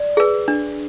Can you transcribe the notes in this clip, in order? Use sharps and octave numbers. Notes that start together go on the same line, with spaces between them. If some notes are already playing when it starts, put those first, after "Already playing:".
Already playing: D5
G#4 B4
D4